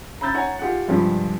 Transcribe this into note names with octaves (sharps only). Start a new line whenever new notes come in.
A#5 B5 E6 G6 A6
C#5 F#5 G#5 A#5
F4 G4 G#4 F#5
G2 C3 F3 G3 G#3